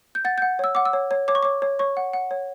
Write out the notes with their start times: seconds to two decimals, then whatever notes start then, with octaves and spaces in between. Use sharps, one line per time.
0.15 G6
0.25 F#5 A6
0.38 F#5 G6
0.59 C#5 E6
0.75 F#5 D6
0.85 E6
0.93 C#5
1.11 C#5
1.28 C#5 D6
1.35 C#6
1.43 C#5 D6
1.62 C#5
1.79 C#5 C#6
1.97 F#5
2.13 F#5
2.31 C#5